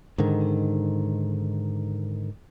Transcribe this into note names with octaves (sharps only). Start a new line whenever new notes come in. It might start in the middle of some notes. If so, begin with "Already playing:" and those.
G#2 D3 D#3